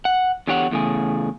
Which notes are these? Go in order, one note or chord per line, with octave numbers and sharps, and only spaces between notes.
F#5
E2 D3 G4 C#5 F#5
E2 A2 C#3 G#4